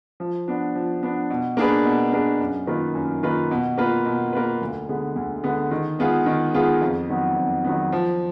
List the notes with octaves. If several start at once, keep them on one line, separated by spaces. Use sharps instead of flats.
F3
B3 D4
F3
B3 D4
B2
A#3 D4 G#4 B4
B2
A#3 D4 G#4 B4
F#2
D#3 A#3 F4 B4
F#2
D#3 A#3 F4 B4
B2
A#3 F4 B4
B2
A#3 F4 B4
D2
D3 G#3 B3
D2
D3 G#3 B3
D#3
G#3 B3 F4 G#4
D#3
G#3 B3 F4 G#4
F2
D#3 F#3 B3
F2
D#3 F#3 B3
F3